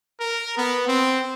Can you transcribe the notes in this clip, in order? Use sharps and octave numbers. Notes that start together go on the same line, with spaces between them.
A#4
B3
C4